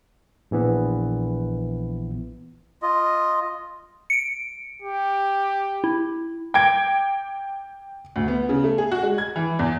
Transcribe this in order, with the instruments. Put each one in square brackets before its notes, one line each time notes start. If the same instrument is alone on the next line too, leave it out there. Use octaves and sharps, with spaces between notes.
[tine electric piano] A#1 E3 B3
[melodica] F4 D#5
[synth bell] C#7 D7
[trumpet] G4
[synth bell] E4
[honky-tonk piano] G5 D6 G#6 D7
[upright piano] D2
B3
C#3
A3
G#4
F#4
G#3
G#6
E3
E2